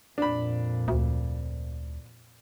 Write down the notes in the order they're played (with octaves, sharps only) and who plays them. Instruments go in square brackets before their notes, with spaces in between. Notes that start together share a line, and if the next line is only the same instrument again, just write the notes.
[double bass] F2 A#2 [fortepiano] D4 B5
[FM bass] D2